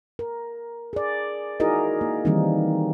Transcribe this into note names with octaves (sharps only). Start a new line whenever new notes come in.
A#4
G#4 D5
D#4 E4 F#4 G#4 A#4 D#5
A#3
D#3 E3 G3 A#3 C4 D#4